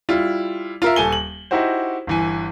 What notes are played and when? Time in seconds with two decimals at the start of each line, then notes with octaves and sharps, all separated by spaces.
0.09 G3 E4 F4
0.82 F4 A#4 E5
0.96 D#1 A4 G#5 G7
1.12 F#7
1.51 D#4 E4 F#4 G4 C5
2.07 G1 E3 G#5